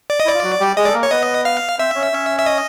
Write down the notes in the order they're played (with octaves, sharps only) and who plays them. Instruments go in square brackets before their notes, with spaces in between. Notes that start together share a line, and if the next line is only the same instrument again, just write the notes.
[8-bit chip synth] D5
D#5
[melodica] E4 [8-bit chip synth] D5
[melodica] F4
F#3 F#4
G3 G4
[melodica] G#3 G#4 [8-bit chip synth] D#5
[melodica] A4 [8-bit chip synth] D5
[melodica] A#3 A#4
[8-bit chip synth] C#5
[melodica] B3 B4 [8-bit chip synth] D#5
[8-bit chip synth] F5
[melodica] C4 C5 [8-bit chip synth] E5
[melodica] C#4 C#5
C#4 C#5
[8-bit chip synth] E5
D#5